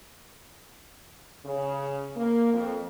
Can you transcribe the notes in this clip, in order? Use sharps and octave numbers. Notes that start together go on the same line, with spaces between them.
C#3
A#3
F2